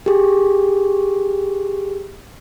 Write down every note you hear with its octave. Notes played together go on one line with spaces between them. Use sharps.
G4 G#4